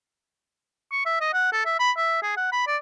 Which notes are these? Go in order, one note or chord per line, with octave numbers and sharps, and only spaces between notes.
C#6
E5
D#5
F#5
A4
E5
B5
E5
G#4
F#5
B5
D5